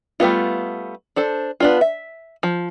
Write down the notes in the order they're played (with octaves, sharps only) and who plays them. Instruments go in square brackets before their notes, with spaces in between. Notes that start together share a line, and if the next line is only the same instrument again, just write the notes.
[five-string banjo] G3 A3 B3 F4
D4 A4 C5
B3 D4 F4
E5
F3